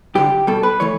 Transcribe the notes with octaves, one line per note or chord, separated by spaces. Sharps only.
G2 D3 G3 G4
B2 G3 A4
B4
E3 A3 C#5